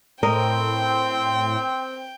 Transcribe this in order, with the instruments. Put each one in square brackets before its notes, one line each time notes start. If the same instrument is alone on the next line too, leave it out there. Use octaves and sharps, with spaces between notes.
[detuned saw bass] A2 [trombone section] C4 [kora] A#4 D#5 [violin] G5